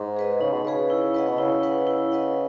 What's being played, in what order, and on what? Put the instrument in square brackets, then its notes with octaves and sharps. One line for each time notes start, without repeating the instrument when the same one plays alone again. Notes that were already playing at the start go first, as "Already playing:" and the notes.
Already playing: [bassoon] G#2
[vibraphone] G#4 B4 D#5
[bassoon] C#3 [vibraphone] D#4
[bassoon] B2
[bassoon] C#3 [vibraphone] G#4 B4 D#5
[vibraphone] E4
B4 D#5 F#5
[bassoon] B2
[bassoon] C#3 [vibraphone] E4
[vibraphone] B4 D#5 F#5
E4
B4 D#5 F#5